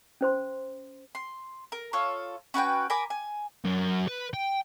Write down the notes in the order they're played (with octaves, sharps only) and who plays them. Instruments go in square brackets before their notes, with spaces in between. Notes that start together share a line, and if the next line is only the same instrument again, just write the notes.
[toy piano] C#4 C5 C6
[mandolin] C6
A#4
F4 A4 C#5
C#4 F#4 B4 G5
A#4 G#5 B5 D6
G#5
[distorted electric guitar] F#2
B4
G5